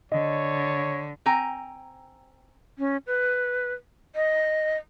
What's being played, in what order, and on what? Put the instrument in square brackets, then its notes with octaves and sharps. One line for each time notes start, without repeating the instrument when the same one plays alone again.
[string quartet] D3 [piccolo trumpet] C#5 [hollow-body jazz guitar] D#5
[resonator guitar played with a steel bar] C4 G5 G#5 A#5
[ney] C#4
B4
D#5